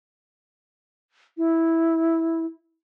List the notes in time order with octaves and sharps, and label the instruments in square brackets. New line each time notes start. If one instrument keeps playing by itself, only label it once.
[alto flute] E4